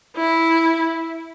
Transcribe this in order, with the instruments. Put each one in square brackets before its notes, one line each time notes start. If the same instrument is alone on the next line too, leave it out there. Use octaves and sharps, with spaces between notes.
[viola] E4